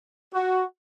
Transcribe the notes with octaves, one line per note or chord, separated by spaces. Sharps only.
F#4